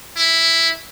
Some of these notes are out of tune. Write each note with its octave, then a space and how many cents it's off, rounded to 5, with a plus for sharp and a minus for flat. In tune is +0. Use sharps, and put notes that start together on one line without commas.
E4 +0